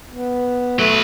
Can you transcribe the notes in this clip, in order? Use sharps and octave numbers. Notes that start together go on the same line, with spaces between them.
B3
F#3 A3 B4